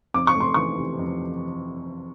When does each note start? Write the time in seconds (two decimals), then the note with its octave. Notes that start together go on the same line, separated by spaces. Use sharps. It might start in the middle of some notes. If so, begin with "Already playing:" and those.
0.14 F2 D6
0.27 C#6
0.35 A3
0.40 C6
0.54 E3 C#6
0.77 C3
0.99 F2